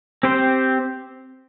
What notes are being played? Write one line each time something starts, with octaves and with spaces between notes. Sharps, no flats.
C4 G4 C5